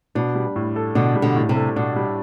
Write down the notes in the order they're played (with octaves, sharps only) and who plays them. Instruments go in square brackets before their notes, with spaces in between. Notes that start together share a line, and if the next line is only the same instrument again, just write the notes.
[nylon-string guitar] B2 [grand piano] D4
[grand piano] G3
A2
A4
[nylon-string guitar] B2 D3 [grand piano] D4
[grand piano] G3
[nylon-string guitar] B2 D3
[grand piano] A2
[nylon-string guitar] C3
[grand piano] A4
[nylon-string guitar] B2 [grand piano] D4
[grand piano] G3